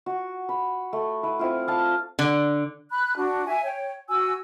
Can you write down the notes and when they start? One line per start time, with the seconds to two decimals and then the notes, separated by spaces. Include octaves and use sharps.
0.06 F#4
0.49 B5
0.93 A3
1.23 E4 B4
1.39 C4 E4 F4
1.67 D5 F5 A5
2.19 D3
2.93 B5 F#6
3.16 D4 F#4
3.47 E5 G#5
3.64 C#5 G5
4.09 F#4 G#5 E6